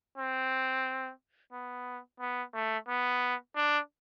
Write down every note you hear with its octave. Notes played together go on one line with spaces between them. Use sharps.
C4
B3
B3
A3
B3
D4